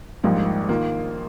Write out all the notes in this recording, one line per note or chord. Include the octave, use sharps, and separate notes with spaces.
A#1 G#2 G3 A#3 F4
D#3 A#3 F4